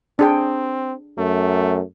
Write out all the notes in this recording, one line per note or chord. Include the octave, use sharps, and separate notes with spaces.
C4 D4 G#4 G5
F#2 A3